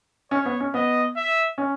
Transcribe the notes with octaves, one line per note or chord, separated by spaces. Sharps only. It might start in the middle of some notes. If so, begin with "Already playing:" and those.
C#4 C#5
B3
C#4
B3 D#5
E5
C#4